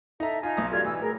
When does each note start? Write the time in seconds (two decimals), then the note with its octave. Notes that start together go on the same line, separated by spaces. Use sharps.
0.20 D#4 A4 E5 A#5
0.43 D#4 F4 G#5
0.57 B1 D#6
0.72 F#3 G3 A3 F4 G#6
0.85 E3 E6
1.00 A2 G#4 A#4